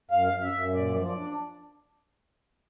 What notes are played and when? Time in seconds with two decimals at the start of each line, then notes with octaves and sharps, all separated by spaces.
0.11 F#2 F5
0.33 F#2
0.43 E5
0.52 F#2
0.74 A#2 D5
0.94 F3
1.05 D5
1.16 D4